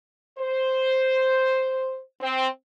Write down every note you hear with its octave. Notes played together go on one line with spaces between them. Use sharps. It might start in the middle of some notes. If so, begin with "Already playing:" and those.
C5
C4